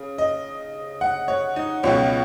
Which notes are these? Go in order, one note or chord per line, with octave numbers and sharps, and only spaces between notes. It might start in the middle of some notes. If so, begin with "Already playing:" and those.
Already playing: C#3
D#5
F#5
C#5
D#4
C#2 B2 F#3 C#4